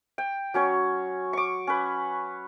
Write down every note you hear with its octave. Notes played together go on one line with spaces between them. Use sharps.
G5
F#3 C#4 C#5
C#6 D6
C#4 B4